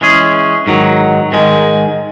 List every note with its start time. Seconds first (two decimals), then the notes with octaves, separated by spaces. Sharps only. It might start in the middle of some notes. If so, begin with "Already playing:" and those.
0.01 E3 G#3 C#4 G#4
0.67 G#2 D#3 F#3
1.32 G#2 D#3 G#3